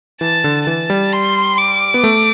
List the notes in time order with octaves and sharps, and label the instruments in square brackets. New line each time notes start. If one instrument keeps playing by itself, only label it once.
[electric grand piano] E3 [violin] A5
[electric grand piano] D3
[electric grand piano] E3 [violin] A5
[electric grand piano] G3
[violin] C6
D6
[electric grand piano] B3
A3